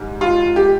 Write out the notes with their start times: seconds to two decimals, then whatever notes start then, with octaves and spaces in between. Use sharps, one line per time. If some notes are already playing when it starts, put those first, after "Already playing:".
Already playing: G#2 G3
0.21 F4
0.56 G4